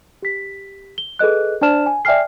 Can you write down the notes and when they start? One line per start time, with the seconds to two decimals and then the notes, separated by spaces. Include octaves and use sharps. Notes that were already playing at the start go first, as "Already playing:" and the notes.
0.22 G4 B6
0.98 G7
1.19 G#4 A4 B4 D#5 F#6
1.61 D4 C5 D5 A5 F6 E7
1.86 G#5
2.05 D5 E5 G5 G#5 F6 C7